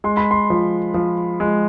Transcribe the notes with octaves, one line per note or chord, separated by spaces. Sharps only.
G#3 C6
B5
C6
F3
F3
G#3